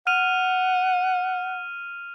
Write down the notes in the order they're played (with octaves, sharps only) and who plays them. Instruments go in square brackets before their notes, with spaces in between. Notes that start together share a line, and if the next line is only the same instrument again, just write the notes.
[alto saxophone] F#5 [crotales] F6 D#7 F7